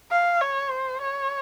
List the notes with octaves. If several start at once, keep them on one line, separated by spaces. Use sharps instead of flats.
F5
C#5
C5
C#5